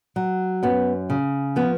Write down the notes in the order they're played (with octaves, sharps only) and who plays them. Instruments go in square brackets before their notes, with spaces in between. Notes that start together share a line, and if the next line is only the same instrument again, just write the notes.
[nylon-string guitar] F#3
F#2 B3
C#3
F3 B3